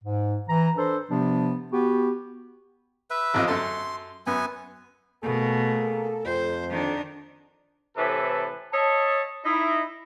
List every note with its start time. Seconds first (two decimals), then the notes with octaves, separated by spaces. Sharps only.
0.04 G#2
0.49 E3 A#5
0.77 D4 A4 B4 C5
1.11 C3 F3 B3 D4
1.72 B3 F#4 G4
3.10 B4 E5
3.34 A1 F2 D#5
3.48 F#2 A4 A5 C6
4.27 F#2 B3 G#5
5.23 B2 A3 A#3 G#4 A4
6.25 F2 C5
6.71 D#3 D4
7.96 A2 C3 E3 A4 B4
8.73 C#5 D#5 E5 A5
9.45 D#4 E4